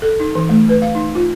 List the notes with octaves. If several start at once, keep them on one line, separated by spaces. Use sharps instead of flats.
A4
D#4
E3
A3
B4
F5
D#4
F4